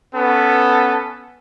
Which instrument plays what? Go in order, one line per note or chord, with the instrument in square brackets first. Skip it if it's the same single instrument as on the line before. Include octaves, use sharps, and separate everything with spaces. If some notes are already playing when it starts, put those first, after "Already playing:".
[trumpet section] B3 C#4 A4